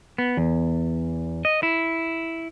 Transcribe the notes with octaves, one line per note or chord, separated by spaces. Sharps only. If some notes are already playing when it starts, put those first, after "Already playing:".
B3
E2
D#5
E4